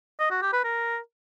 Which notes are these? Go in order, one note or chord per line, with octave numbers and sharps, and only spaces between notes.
D#5
F#4
G4
B4
A#4